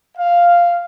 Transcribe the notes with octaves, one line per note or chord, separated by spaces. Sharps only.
F5